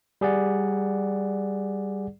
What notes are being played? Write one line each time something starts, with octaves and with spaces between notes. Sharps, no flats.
G3 G#4 D5 F#5